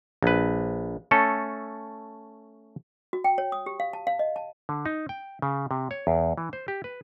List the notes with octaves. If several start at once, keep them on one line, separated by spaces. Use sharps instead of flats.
A#1 B4
A3 C#4 A4
F#4
G5
C#5
D#6
G4
F5
A5
F5
D#5
A5
D3
D#4
G5
C#3
C3
C#5
E2
E3
C5
G4
B4